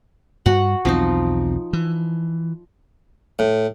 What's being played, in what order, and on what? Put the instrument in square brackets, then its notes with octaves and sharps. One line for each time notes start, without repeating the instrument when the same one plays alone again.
[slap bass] G2 [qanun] F#4 F#5
[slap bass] B1 E2 C4 [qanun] F3 D#4
[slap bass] E3
[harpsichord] A2